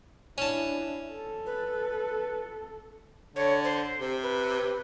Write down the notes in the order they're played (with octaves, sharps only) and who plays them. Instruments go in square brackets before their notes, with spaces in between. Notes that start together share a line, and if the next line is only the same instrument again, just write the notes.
[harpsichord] C#4 A5 [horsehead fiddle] D4 E4
[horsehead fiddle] A4
[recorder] B4
[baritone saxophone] D3 [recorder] C#5
[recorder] C5
[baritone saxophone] C3
[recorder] B4